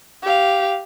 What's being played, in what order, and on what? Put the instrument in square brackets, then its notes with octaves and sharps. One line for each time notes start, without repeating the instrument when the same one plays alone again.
[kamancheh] G4 F5